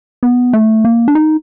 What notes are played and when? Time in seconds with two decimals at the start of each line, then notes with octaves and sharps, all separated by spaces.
0.23 B3
0.53 A3
0.85 A#3
1.08 D4
1.15 D#4